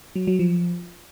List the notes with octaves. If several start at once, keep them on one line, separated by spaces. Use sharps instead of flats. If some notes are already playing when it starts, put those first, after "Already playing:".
F#3
F#3
F3